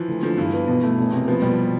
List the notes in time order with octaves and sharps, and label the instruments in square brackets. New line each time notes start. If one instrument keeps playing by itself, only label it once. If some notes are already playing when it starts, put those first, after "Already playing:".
Already playing: [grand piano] E3 F3
[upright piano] D2
[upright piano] D3 [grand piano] F3
[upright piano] G2 [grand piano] E3
[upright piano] B3
B2
A3
E1
C3
[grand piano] F3 [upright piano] B3
[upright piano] B2 [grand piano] G3